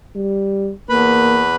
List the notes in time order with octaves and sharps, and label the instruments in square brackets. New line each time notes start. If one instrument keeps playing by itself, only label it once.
[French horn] G3
[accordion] E2 B4 B5 [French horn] A#3